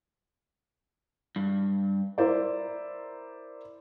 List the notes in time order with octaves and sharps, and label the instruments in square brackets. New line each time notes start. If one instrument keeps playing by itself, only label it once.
[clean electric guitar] G2
[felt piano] E4 A#4 C5 D5